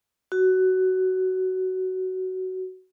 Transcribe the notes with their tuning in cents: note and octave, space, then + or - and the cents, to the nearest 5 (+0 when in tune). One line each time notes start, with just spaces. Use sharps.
F#4 +15